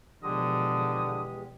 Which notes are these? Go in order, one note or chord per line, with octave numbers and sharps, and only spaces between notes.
E2 B2 D3 F3 G#3 G4 D#6